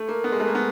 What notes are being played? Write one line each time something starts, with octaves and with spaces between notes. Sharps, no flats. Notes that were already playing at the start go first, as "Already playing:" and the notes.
Already playing: A3
A#3
B3
G#3
A3
A#3
B3